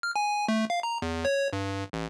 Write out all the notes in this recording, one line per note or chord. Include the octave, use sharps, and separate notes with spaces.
F6
G#5
A3
F5
A#5
E2
C#5
G2
A1